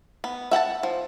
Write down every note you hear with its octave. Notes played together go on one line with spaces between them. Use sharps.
B3
E5 F#5 G5 A5
F3